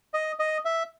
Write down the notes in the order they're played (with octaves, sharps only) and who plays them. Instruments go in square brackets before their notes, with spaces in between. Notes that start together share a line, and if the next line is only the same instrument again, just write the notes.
[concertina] D#5
D#5
E5